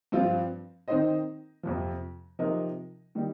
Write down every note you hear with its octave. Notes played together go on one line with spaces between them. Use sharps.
G2 F3 C4 F4
D#3 C4 D#4 C5 D#5
F2 C3 F3
C3 F3 D#4 A#4 D#5
D#3 G3 D#4